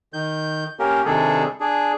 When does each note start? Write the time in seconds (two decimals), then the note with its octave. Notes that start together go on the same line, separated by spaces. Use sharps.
0.13 D#3 G6
0.79 A#3 C#4 G4 A#4
1.06 C3 D#3 G3 D4 G#4 A4
1.60 D4 G#4